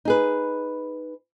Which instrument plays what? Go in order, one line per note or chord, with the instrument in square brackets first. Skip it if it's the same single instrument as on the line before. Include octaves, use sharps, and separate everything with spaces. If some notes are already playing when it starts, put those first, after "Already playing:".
[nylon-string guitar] D#4 G#4 B4